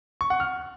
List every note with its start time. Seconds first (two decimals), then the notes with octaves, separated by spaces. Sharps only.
0.21 C#6
0.30 F#5
0.40 F6